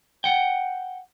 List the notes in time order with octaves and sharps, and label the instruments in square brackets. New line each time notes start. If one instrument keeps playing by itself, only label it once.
[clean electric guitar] F#5 G5